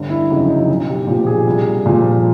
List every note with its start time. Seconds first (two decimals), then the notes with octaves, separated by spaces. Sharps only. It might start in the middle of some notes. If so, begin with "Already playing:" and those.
Already playing: G1
0.10 E4
0.30 F2 C#3 F#3 D#4
0.50 D#4
0.69 B1
0.88 G4
1.07 A#2 G4
1.11 F3
1.26 G#4
1.47 C2
1.86 A#2 F3